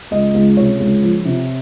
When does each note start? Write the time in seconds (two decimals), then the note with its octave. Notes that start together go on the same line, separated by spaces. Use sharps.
0.11 C#2 D#5
0.34 C#2
0.57 C3 C#5
0.80 C#2
1.02 F3
1.25 C3